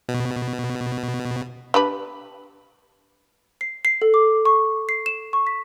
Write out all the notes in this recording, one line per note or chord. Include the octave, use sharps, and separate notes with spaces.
B2
D4 G4 B4
C7
C7
A4
D6
C#6
C7
E7
C#6
B6